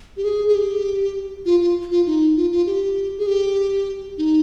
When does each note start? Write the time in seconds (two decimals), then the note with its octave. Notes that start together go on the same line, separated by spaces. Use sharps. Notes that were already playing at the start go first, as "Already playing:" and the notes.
0.17 G4
0.24 G#4
0.47 G#4
0.55 G4
1.45 F4
1.61 F4
1.91 F4
2.07 D#4
2.36 F4
2.52 F4
2.66 G4
3.18 G#4
3.27 G4
4.18 D#4